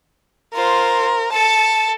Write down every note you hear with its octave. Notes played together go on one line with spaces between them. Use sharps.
F4 A#4 C5
A4 A5